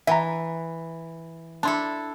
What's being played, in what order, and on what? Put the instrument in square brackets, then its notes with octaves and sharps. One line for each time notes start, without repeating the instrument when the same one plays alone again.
[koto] E3 [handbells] E5 F#5 A#5
[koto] D4 E4 A4 [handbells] A5 C6